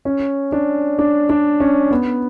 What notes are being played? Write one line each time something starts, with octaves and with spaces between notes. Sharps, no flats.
C#4
D4
D4
D4
C#4
B3